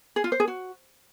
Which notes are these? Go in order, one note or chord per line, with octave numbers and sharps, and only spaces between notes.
G#4
F4
C5
G#4
F#4